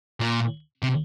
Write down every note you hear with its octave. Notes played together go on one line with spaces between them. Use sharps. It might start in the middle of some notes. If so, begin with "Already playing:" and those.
A#2
C3